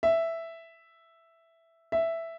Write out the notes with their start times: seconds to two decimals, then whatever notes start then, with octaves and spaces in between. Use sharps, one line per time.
0.03 E5
1.92 E5